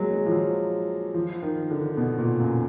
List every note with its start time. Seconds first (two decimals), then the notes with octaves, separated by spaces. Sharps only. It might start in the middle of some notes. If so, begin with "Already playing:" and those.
Already playing: F#3 G#3 A#3
0.11 G#3
0.26 F3
0.32 F#3
1.14 F3
1.42 D#3
1.71 D3
1.97 B2
2.19 A#2
2.40 F#2